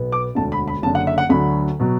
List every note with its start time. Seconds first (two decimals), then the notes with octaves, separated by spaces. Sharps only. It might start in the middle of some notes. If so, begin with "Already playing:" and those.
Already playing: B1 B2 B3
0.12 D6
0.35 E1 D2 D3 A5
0.52 B5
0.68 B5
0.82 F#1 F#2 D3 A5
0.95 F#5
1.07 E5
1.18 F#5
1.30 D2 D3 F#3 B5
1.80 B2 F#3